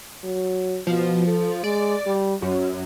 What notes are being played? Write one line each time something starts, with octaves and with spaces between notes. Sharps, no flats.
F#3
B2 F3
A4
G#3 D5
G3
F#2 F#3